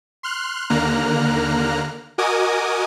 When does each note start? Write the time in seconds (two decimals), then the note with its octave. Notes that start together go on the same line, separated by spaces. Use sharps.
0.23 C6 F6 F#6
0.70 D#2 D3 A#3 A#5 F6 F#6
2.18 F#4 A#4 D#5 G#5 D6 D#6